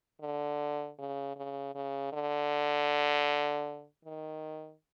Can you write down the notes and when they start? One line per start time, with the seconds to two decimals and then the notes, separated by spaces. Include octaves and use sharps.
0.21 D3
0.99 C#3
1.36 C#3
1.75 C#3
2.13 D3
4.05 D#3